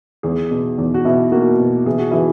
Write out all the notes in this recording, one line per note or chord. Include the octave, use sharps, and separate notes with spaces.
E2 G#4
B2
E2
F#4
B2 E4
A#3 F#4
B2
E3 G#4
F#4
E3 E4